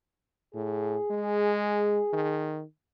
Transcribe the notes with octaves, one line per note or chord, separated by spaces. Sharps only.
A2 G#4
G#3
D#3